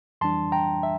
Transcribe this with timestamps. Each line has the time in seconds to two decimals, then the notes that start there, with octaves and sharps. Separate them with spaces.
0.21 F2 E3 G3 D4 A5 C6
0.52 G5 A#5
0.83 E5